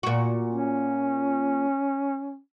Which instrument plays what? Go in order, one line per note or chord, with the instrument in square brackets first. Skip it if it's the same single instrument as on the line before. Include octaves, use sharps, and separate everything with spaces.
[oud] A#2 F#4
[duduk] C#4